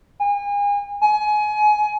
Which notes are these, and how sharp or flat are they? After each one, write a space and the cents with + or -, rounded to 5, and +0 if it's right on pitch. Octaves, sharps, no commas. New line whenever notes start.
G#5 -35
G#5 +25